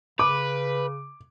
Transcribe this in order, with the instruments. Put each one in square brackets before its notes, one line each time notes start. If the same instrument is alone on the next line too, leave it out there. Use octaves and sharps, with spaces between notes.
[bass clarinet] C#3 [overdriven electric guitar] B4 [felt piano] D6